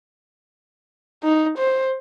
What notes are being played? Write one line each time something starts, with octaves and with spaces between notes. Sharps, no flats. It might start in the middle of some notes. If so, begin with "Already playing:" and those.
D#4
C5